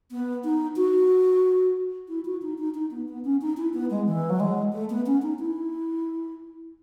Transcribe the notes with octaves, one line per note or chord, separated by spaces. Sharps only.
B3
D#4
F#4
E4
F#4
D#4
D#4
D#4
B3
B3
C#4
D#4
E4
B3
G#3
E3
F#3
G#3
A3
B3
C#4
D#4
E4